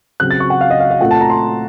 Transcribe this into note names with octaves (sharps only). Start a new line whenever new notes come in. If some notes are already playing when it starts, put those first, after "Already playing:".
C#3 F#3 C4 F#6
A6
C#6
F#5
F5
D#5
F5
F5
A#2 A3 C4 F#5
A5
A#5
C6